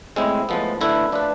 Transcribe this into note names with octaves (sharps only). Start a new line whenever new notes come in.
A2 G#3 C4 E4
A2 F3 G#3 B3
D3 A3 E4 B4
F3 A3 D4 F4 B4